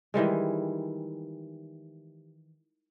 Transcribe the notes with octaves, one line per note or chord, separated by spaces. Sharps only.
D#3 E3 G3 G#3